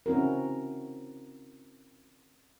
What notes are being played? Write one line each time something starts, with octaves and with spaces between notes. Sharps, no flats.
C4 C#4 E4 F#4 A#4